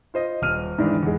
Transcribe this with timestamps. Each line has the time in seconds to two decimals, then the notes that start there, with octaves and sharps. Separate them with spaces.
0.14 F4 C5 D#5
0.42 D#1 F6 D#7
0.78 G#2 D#3 E3 D4
1.03 E2 G#3